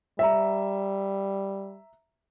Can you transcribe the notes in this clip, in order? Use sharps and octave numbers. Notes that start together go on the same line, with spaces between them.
G3 E5 A#5